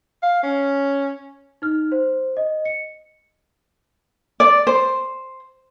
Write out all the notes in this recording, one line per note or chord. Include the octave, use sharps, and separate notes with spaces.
F5
C#4
D#4 F6
C5
D#5
C#7
D5
C5